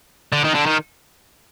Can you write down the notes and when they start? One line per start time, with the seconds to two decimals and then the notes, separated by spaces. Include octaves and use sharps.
0.33 D3
0.45 D#3
0.55 D3
0.66 D#3